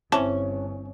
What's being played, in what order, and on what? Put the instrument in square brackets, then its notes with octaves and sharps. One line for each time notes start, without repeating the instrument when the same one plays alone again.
[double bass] G1 G2 [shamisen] E3 A5 [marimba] C4 C5 [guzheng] C#4